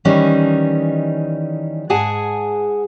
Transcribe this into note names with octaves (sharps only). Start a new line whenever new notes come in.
D#3 E3 G3 C#4 D#4
G#2 G#4 F#5 G#5 A5